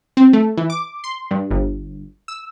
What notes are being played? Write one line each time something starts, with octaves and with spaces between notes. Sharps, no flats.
C4
A3
E3
D6
C6
G2
G1
E6